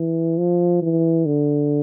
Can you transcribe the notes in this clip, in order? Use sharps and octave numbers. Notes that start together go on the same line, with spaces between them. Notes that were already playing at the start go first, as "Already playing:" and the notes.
Already playing: E3
F3
E3
D3